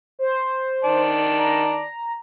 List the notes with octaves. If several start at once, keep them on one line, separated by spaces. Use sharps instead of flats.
C5
D#3 D5 A5
A#5